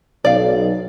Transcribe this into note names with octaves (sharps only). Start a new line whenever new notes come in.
B1 D5 F5